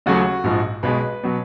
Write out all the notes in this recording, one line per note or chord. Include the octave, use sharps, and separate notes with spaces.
D#2 C#3 F#3 A3 F#4
A#1 G#2 F3
B1 B2 G#3 B4
B2 F#3